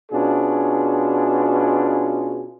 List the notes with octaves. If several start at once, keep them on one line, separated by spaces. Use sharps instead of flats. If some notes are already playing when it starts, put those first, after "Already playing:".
B2 C#4 D4 F4 G#4